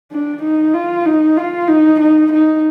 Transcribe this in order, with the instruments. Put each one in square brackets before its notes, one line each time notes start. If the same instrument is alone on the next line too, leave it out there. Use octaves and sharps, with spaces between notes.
[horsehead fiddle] D4
D#4
F4
D#4
F4
D#4
D#4
D#4